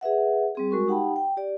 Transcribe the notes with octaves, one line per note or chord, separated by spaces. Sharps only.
G#4 B4 E5 F#5
G3 C4 G#4
G#3 F#4 A#4 C#6
D#4 G4 F#5 G5 A5 B5
G5
G4 D5